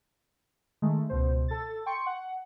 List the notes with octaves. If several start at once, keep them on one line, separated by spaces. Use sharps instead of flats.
D#3 G#3 A3
C#2 B2 C5
A4 A6
G5 C6 C#6 C#7
F#5